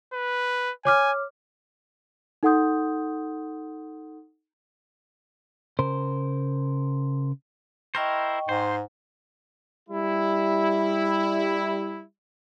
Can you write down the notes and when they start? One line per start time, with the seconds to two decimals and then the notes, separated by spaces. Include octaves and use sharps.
0.13 B4
0.85 C#5 G#5 D6 F6
2.43 D#4 A4 F#5 C6 D#6 G6
5.79 C#3 A#4 C5
7.95 E4 A#4 C5 D#5 G5 C#6
8.49 G#2 C5
9.89 G3 E4